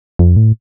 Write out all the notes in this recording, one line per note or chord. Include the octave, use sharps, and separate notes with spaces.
F2
A2